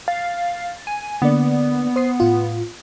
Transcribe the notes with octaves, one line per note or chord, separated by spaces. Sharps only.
F5 A6
G#5
D3 A#3 B3 D5
C5 D#6 C7
A2 F4